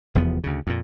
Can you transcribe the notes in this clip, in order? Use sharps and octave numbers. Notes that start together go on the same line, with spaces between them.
F1 E2 F3 B3
D2 C#3
F2 A#2